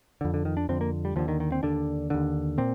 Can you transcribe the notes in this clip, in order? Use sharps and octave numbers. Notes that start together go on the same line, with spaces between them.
F2 D3
D3
D#3
D4
F2 D3 C4
A#3
G3
D#2 D3 F3
D#3
D#3
C4
D#2 D3 D4
D#2 D3
A#2 C4